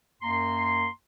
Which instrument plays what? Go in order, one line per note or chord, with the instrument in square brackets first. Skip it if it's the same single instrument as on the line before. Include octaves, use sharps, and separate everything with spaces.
[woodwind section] F#2 A#3 A#5 C6